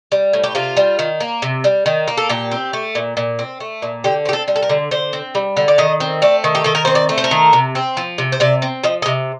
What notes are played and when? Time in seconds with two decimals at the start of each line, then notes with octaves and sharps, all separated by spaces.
0.12 G3
0.33 A2
0.44 G4
0.55 C3 F4
0.77 G3
0.99 D#3
1.20 A#3
1.42 C3
1.64 G3
1.86 D#3
2.08 A#3
2.17 A4
2.29 A#2 G4
2.51 C4
2.73 A3
2.95 A#2
3.17 A#2
3.39 C4
3.60 A3
3.82 A#2
4.04 D3 G4
4.25 C4 G4
4.33 A4
4.48 G3
4.56 A4
4.62 A#4
4.69 D3
4.91 D3 C5
5.13 C4
5.35 G3
5.57 D3
5.68 D5
5.78 D#3 D#5
6.00 C4
6.22 A3 D5
6.44 D#3
6.55 G4
6.64 D#3 A4
6.75 A#4
6.85 C4 C5
6.95 D5
7.09 A3
7.18 C5
7.24 A#4
7.31 D#3
7.53 C3
7.75 C4
7.97 F3
8.18 C3
8.32 C5
8.40 C3 D5
8.62 C4
8.84 F3 D#5
9.02 D#5
9.06 C3